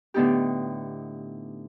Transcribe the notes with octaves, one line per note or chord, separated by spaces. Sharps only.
A2 D3 B3 D#4 G4